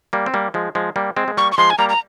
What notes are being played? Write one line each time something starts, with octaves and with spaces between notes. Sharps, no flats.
G3 A#3
C4
G3 A#3
F3 G#3
F3 G#3
G3 A#3
G#3 C4
G#3
G3 A#3 C#6
C#6
F3 G#3 C6
G#5
G3 A#3 A#5
A#5